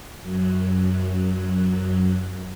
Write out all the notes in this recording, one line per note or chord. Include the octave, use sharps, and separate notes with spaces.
F#2 F#3